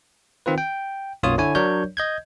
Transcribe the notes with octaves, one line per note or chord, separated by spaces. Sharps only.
D#3 C4 F4 B4
G5
B1 F#2 A#3 F4 C#5 D#6
D3 E4 C#5 G#5
F#3 D4 A#4 C#5 D5 G6
D#5 G6 G#6